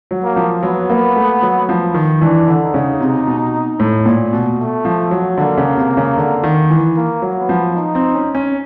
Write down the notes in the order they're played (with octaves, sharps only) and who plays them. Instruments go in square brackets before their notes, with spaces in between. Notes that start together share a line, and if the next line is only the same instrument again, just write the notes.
[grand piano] F#3
[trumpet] A#3
[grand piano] F3
[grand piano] F#3 [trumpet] B3
[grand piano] A#3
A3
F#3
F3
D#3
[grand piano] E3 [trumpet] D4
[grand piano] D3
[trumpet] D#4
[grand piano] C#3
C3
B2
A2
A#2
B2
[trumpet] A3
[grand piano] F3
F#3
[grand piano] D3 [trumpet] A#3
[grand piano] C#3
C3
C#3
D3
D#3
E3
[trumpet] A#3
[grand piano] F#3
[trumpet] B3
[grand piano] F3
[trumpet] D#4
[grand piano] C4
C#4
C#4